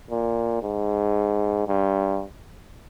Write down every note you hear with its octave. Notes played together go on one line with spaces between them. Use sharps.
A#2
G#2
G2